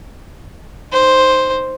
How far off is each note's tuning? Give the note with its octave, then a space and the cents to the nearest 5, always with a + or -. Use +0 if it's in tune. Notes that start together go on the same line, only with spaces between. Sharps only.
D#4 +0 C5 +0